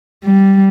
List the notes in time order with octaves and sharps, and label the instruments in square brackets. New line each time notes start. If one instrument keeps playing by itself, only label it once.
[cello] G3